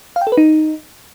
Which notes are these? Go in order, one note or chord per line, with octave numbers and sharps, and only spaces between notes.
F5
G5
A4
B4
D#4